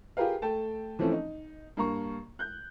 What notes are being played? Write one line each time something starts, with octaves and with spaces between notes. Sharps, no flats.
F4 G4 G#4 A#4 B4 F5
A3 A4 G5 A5
E3 F3 A3 C4 C#4 E4
D#4
G2 A#3 A#5 C#6
F#6 G6